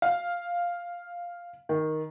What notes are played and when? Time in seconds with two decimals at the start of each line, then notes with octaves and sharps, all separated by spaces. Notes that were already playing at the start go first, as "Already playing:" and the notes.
0.02 F5
1.69 D#3